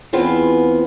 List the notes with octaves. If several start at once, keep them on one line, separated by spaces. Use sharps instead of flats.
E2 B3 C4 F4 G#4